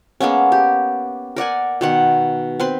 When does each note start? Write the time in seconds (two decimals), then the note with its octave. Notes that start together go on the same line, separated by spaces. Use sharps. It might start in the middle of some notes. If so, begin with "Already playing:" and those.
0.20 G#3 A#3 B3 C#4
0.52 G4
1.36 A#4 D5 F#5 G#5
1.81 B2 D#3 F#5
2.60 C4 B4 C6